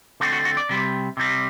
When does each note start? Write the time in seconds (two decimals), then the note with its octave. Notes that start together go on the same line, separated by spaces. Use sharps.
0.20 D3 A3 C4 F#4
0.32 F#4
0.45 F#4
0.57 D5
0.69 C3 G3 C4
1.17 C3 G3 C4